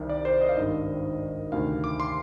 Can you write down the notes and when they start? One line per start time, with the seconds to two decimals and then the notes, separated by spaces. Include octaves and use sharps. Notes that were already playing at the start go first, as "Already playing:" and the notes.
Already playing: C2 C3 D#3
0.10 D5
0.25 C5
0.41 D#5
0.49 F5
0.57 G#1 G2 D#3 D#5
1.52 D2 C3 D#3 F5
1.84 D6
2.00 C6